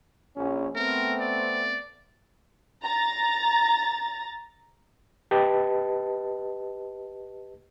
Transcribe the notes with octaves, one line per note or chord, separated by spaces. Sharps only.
A#1 C#4
A3 B3 C4 A#4
D5
A#5 A6
G4 B4 D#5 A5